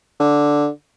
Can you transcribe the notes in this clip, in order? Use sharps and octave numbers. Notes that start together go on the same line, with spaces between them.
D3